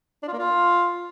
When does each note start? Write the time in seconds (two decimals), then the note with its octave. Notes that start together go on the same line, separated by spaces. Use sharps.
0.23 D4
0.28 F4
0.33 A#3
0.38 F4